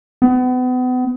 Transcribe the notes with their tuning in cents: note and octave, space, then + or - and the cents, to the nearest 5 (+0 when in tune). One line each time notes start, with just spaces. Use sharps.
B3 +35